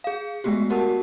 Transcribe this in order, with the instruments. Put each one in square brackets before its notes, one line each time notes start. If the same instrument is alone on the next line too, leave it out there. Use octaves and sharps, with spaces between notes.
[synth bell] G#4 F5
G#3 A3 B3 F#4 G4
F#4 G4 A#4 F#5 A5